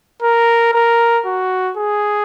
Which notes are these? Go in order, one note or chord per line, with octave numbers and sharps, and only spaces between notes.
A#4
A#4
F#4
G#4